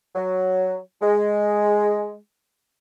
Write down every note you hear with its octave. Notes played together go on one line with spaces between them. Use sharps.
F#3
G#3